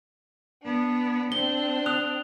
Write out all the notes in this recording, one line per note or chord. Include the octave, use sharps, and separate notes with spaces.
B3 D4
C4 D4 G7
D#6 F#6 F7